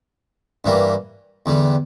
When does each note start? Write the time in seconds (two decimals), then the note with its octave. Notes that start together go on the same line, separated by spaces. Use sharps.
0.65 G2 E3 G3 A#3
1.46 E2 D3 G3